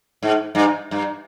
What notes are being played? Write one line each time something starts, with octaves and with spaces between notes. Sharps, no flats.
G#2
G2
G2